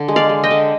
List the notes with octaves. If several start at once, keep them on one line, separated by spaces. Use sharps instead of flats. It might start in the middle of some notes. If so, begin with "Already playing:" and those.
Already playing: D3
G#3
D5 F5
G#3
D#5 G5
D3